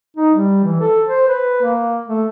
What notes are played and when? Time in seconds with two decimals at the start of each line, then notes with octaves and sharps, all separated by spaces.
0.17 D#4
0.34 G3
0.64 E3
0.80 A4
1.05 C5
1.28 B4
1.62 A#3
2.08 A3